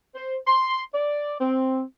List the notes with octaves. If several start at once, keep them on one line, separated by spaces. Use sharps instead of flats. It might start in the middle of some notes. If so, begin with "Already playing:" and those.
C5
C6
D5
C4